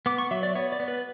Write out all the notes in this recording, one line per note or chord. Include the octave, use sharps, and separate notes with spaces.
B3 D6
C#6
F#3 E5
D5
B3 C#5
D5
B3
B4